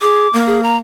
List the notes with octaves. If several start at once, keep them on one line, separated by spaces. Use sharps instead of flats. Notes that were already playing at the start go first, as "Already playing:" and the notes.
G#4 D6
A#3
G#4
A#5